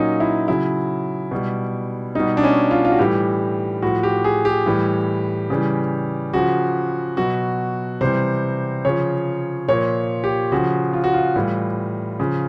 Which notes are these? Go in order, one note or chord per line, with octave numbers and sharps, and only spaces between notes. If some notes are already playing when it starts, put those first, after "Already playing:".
Already playing: A#2 F#3 C#4 D#4
E4
C#3 F#3 E4
B2 G3
B2 G3 D#4
D4
C#4
F4
F4
F#4
A2 E3 G3 G4
A2 F3 F#4
G4
G#4
G4
A2 E3 G3
C#3 E3 G3
C#3 F3 F#4
B2 F#3 F#4
C3 E3 G3 C5
C#3 F3 C#5
A#2 F3 C#5
G4
C#3 F3 F#4
F4
F#4
F4
A2 E3 G3
C#3 F3